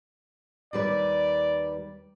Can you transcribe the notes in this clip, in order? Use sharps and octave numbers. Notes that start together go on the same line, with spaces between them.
D#2 G3 B4 D5